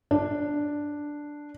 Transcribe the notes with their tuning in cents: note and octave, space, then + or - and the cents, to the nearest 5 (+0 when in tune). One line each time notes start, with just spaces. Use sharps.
D4 +0